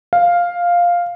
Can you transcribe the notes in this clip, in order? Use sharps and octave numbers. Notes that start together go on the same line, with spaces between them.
F5